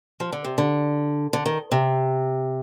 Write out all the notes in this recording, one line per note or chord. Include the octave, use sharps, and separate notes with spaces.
F3
D3
C3
D3
D3
D#3
C3